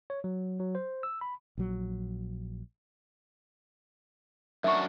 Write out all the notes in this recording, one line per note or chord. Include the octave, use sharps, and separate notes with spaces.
C#5
F#3
F#3
C5
E6
B5
A#1 F#3
F#2 D4 F#4 E5 C#6